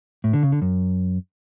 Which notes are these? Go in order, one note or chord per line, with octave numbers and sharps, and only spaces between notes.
A2
D3
C#3
D3
F#2